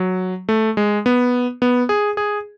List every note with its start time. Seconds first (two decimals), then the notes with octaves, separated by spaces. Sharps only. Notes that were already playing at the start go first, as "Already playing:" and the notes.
Already playing: F#3
0.49 A3
0.77 G#3
1.06 B3
1.62 B3
1.89 G#4
2.17 G#4